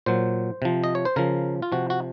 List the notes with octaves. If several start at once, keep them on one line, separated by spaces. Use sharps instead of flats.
A#2 F#3 C5
C3 F3
D#5
C#5
C5
C#3 F3 A#4
F4
C3 F3 F#4
F#4